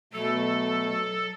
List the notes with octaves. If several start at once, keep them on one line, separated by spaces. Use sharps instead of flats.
B2 F#3 A3 A4